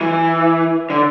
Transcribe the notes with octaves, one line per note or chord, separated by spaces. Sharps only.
E3
D3